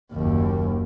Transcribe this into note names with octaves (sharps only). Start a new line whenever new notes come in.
F#1 D#2